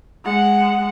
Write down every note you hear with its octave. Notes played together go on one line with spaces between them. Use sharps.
G#3 F#5